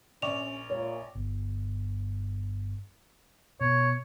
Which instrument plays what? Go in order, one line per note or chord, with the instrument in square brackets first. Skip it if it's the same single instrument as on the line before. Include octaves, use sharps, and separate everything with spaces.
[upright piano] A#1 D5 C#6 [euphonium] C#4 [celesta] F7
[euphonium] A#2 [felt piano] C#5
[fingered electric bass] G1
[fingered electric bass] B2 [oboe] C#5